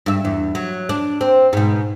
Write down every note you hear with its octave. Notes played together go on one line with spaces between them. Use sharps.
G2 E5
E2
F#3
D4
C4
G#2 B2